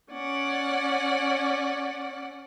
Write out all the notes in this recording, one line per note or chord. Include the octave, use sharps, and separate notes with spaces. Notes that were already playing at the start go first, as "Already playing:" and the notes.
C#4 D5 F#5